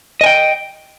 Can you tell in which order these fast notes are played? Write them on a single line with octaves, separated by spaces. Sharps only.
D#5 G#5 G5